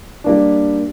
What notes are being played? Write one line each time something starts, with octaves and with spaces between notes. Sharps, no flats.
G3 A#3 D4